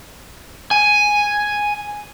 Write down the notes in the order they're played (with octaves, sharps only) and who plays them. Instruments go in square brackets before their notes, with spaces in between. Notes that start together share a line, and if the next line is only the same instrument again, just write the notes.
[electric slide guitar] G#5